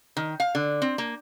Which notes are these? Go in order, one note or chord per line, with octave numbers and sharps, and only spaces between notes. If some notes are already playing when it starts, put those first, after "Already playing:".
D#3
F5
D3
C4
A#3